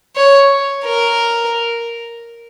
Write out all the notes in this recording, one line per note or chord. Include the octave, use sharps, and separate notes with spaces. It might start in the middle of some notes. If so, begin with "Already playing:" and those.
C#5
A#4